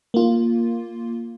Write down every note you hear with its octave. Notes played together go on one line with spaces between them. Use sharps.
A#3 F4